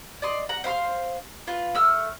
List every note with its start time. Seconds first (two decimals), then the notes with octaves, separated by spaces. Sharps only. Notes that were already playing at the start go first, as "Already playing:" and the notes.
0.22 D5 D#5 C6
0.49 F#5 A#5
0.64 C5 F5 B5 C6
1.47 F4 B4
1.75 A3 E6 F6